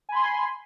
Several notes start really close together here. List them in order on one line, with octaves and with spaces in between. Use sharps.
G#5 B5 C6